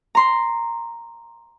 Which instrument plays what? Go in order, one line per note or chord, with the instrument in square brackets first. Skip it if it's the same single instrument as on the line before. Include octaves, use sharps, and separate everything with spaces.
[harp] A#5 C6